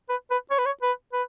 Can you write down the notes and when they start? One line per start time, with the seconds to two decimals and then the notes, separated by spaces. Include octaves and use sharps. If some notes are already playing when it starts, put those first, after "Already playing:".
0.09 B4
0.31 B4
0.51 C#5
0.59 B4
0.66 C#5
0.82 B4
1.13 B4